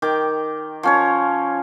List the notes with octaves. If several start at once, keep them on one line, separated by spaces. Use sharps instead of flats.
D#3 G5 D6
F3 C#4 C#5